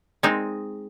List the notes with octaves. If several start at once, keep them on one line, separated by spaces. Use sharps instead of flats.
G#3 C4 D#4